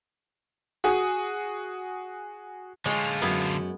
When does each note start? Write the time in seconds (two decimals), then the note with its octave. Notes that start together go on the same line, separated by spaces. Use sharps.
0.84 F#4 G#4
2.86 D3 G#3 F4 C#5 G#5
3.22 F#2 B3 E4